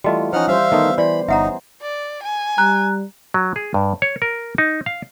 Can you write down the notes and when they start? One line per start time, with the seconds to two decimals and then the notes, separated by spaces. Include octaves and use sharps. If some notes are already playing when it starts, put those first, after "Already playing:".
0.04 E3 G3 A3 F4 F#4 D#5
0.33 F3 C#4 D#4 F#5 F6
0.48 G3 C5 E5 F5
0.72 D#3 A3 B3 D#4
0.98 E3 D5 B5
1.28 G1 C#4 D#4 E5 F#5 A#5
1.82 D5
2.23 G#5
2.58 G3 A#5 F#6
3.34 F#3
3.56 G#4
3.74 G2
4.02 C#5
4.22 A#4
4.58 D#4
4.86 F5